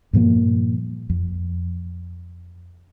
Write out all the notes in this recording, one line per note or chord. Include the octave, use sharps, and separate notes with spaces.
G2 A#2 F3 A#3
F2